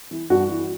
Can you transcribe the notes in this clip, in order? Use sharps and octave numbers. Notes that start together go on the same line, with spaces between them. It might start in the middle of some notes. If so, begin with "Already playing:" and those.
E3
G2 F#4
E3